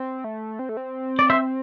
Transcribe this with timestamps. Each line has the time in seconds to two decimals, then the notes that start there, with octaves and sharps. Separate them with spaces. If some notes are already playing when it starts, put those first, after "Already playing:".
Already playing: C4
0.24 A3
0.59 C4
0.69 A3
0.77 C4
1.19 D5
1.30 C5 E5